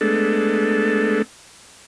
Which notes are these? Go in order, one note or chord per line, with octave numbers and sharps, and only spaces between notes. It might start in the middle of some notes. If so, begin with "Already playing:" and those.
G#3 A3 B3 D4 A4